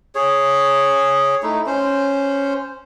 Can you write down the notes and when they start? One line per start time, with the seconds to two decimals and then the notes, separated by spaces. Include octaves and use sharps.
0.15 G#4 C#5
1.43 A3 D#4 E4
1.66 C#4 C5